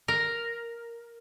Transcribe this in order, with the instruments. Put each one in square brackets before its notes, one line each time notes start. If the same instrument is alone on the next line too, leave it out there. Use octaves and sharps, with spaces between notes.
[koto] A#4